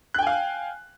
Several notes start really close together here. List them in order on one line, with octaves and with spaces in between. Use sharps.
F#6 G5 G#5 F5